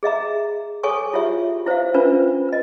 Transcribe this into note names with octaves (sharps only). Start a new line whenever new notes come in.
G#4 D#5 E5 A#5
G#4 A4 C#5 G#5 C#6 D#6
E4 F4 G4 C#5 E5
E4 C5 C#5 E5 F5
C#4 D4 F4 B4 C5
B4 D#5